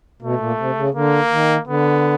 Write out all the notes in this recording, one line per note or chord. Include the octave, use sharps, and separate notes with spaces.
B2 A3
A#2
C3
C#3
D3 A#3
D#3
D3 B3